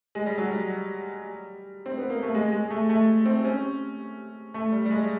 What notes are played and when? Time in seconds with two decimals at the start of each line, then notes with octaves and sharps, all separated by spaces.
0.15 G#3
0.26 G3
0.38 F#3
0.48 G3
1.86 C4
1.98 B3
2.10 A#3
2.23 A3
2.35 G#3
2.52 G#3
2.70 A3
2.89 A3
3.26 C4
3.45 C#4
4.54 A3
4.72 G3
4.85 G3
4.91 G#3